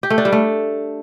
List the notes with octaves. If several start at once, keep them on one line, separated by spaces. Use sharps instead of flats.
G4
A3
D4
G3
A3